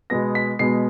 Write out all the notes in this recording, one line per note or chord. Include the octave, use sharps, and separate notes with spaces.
B2 G#3 B3 A#6
B6
B2 G#3 B3 C7